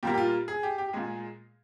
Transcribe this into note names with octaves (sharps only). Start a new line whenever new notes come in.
A#2 G3 A#3 G4
G4
F4
G#4
G4
G4
G4
A#2 G#3 G#4